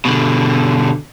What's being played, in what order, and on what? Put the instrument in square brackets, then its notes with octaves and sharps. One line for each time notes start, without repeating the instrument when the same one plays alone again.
[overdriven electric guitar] B2 D3